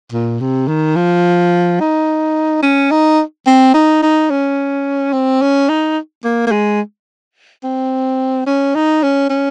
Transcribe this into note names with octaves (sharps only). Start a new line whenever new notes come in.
A#2
C3
D#3
F3
D#4
C#4
D#4
C4
D#4
D#4
C#4
C4
C#4
D#4
A#3
A#3
G#3
C4
C#4
D#4
C#4
C#4